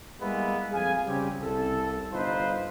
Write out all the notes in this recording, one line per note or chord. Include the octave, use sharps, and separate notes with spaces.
G3 G#3 A#3 B3 E4 B4
F2 G#4 F5 G#5
C#3 G3 C4 G4
C2 A4
G1 D#4 F4 B4 C5